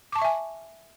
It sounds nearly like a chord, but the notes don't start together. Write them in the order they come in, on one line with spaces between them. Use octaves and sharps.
D6 A5 C#6 E5 G#5